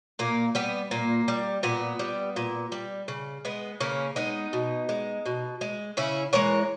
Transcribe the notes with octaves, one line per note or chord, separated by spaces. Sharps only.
A#2 A#3
G3 B3
A#2 A#3
G3
A#2 B3
G3
A#2
G3
C#3
G#3 B3
C#3 A#3 C#4
G#3 B3 D#4
B2
G#3
B2
G#3
C#3 C#4 E4
E3 G#3 A#4 C#5